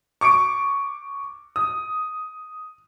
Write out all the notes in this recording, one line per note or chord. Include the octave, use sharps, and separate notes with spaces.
C#6 D6 C#7 D7
D#6